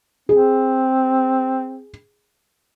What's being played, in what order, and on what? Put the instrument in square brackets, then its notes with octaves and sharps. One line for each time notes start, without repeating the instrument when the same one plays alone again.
[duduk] C4 [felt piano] G#4